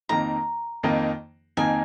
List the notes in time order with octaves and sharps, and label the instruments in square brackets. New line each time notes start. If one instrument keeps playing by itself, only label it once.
[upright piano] F2 D#3 A#3 D#4 [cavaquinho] A#5
[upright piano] F2 D#3 A#3 D#4
[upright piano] F2 D#3 A#3 D#4 [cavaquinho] G#5